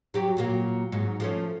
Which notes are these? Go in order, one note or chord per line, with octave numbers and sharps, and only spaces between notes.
F#3 G4
A#2 F#3 A#3
G#2 F#3
F3 A3 C#4